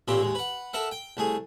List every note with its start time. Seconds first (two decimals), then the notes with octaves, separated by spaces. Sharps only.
0.08 A1 A#2 E3 A#3 C4 G4
0.22 D#2 G#3
0.35 B4 F#5
0.73 A4 A#4 E5 F#5
0.91 G5
1.17 C2 A3 G#4